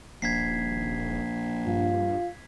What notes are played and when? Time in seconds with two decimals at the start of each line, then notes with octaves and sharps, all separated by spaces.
0.22 D#1 A#1 G#6 B6 C7
1.66 G2 F4